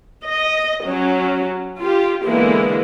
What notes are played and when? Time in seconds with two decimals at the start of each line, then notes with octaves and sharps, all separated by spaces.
0.25 D#5
0.86 F#3 C#4
1.80 F4 G4
2.25 D3 E3 G#3 A#3 B3 E4